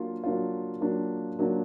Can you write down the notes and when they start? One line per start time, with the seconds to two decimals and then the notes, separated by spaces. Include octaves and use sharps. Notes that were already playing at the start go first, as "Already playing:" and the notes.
Already playing: F#3 A#3 D4 F4
0.24 F#3 A#3 D4 F4
0.81 F#3 A#3 D4 F4
1.39 F#3 A#3 D4 F4